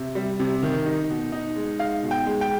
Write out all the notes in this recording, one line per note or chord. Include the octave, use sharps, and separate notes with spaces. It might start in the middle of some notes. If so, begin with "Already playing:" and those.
Already playing: C3 E5
G3
C3
D#3
D#4
B2
D#4
G#3
D#4 F5
B2
G5
G#3
G5